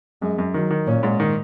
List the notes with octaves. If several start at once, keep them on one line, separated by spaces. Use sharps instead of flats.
F#2 G#3
F#2
D#3 F#3
D#3
A#2 C#4
G#2
D#3